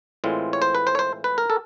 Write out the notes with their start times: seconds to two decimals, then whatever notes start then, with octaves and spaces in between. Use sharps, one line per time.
0.24 A2 E3 G#3 C4 F4
0.53 C#5
0.62 C5
0.75 B4
0.87 C5
0.95 C#5
0.99 C5
1.24 B4
1.38 A#4
1.50 A4